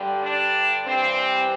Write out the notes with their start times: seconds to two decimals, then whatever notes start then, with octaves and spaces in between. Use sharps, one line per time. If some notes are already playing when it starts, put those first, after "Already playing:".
Already playing: G2 D3 G3
0.22 D4
0.86 G2 E3 G3 C4